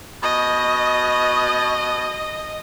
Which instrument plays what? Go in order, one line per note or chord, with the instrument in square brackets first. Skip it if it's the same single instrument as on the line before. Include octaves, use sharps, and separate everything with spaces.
[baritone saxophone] B2 [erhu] D#5